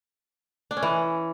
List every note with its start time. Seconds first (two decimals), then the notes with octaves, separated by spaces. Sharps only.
0.71 D4
0.77 C#4
0.83 E3